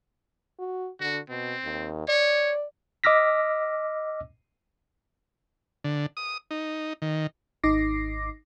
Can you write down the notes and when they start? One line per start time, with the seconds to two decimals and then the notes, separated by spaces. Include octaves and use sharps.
0.59 F#4
1.00 D3 F#4
1.29 B2 C4
1.64 D#2
2.08 C#5 D5
3.04 D#5 D6 E6 F6 A#6 B6
5.84 D3
6.17 D#6
6.51 D#4
7.02 D#3
7.64 G#1 D#4 D6 A#6 C7